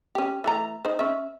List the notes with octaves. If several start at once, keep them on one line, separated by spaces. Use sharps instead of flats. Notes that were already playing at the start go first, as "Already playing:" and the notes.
C#4 G4
E3 A3 A#5
D#4 C5
C#4 E5